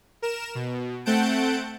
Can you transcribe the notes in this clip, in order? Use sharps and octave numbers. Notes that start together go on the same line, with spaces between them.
A#4 E7
B2
A3 C4 F#5 A5 G6 D7